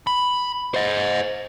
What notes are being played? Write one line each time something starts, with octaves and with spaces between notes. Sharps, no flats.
B5
C5 D#5